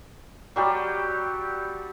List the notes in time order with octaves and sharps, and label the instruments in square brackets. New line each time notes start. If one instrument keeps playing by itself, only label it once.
[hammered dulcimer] F#3 G3 G4 A4